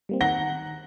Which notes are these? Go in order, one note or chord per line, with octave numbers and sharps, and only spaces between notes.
G3 A#3 C4
D#3 F#5 A#5 A#6 G7